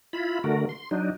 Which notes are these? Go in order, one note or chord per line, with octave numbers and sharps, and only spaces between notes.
E4 F4 B5
D3 A3 F#4 A#4
C6
F#3 D4 D#4